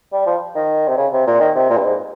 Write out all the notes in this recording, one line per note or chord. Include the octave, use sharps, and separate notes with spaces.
G3
F3
D#3
C3
C#3
C3
A#2
D#3
C3
A#2
G2
G#2